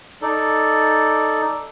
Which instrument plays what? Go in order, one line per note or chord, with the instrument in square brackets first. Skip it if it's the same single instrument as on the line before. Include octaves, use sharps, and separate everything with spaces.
[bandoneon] D#4 A4 D5